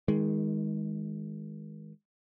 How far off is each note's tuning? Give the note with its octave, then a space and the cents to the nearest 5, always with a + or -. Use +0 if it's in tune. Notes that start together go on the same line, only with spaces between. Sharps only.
D#3 +30 G#3 +0